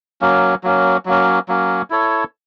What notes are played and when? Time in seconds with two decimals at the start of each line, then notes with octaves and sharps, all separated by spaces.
0.21 F#3 A#3 C#4
0.64 F#3 A#3 C#4
1.05 F#3 A#3 C#4
1.48 F#3 A#3 C#4
1.90 E4 A4 C#5